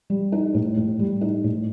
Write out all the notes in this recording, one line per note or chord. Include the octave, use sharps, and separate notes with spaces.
G3
D#4
A2
A2
G3
D#4
A2